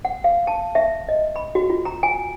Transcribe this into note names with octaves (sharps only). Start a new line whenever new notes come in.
F#5
F5
A5
E5
D#5
B5
F#4
F4
A#5
G#5